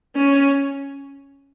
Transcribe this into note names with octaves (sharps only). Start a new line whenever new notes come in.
C#4